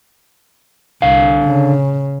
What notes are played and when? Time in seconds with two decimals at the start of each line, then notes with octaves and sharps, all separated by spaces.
1.02 C2 D3 F5
1.44 C#3